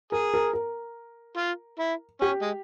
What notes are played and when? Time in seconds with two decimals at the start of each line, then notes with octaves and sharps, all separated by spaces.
0.12 G#4 A#4
0.34 A#4
0.53 A#4
1.37 F4
1.79 E4
2.21 C#4 G4
2.42 G#3